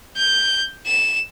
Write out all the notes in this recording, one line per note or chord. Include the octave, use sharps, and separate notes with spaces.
G6
E7